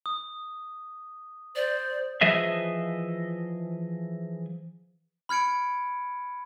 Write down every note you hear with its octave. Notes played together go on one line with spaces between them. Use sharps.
D#6
C5 D5
E3 F3 G#4 D#5 E5
B5 F6 G#6 C#7 D7